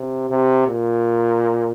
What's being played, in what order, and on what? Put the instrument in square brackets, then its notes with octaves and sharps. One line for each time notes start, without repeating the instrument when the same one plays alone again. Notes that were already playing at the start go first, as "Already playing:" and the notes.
Already playing: [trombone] C3
C3
A#2